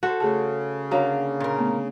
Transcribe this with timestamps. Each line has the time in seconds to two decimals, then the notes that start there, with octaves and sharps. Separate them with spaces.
0.03 F#4 A4 C5
0.20 C#3 A3 G#4 A5
0.91 D3 A#3 F#4 C#5 A#5
1.40 A#2 A#4
1.58 A3 B3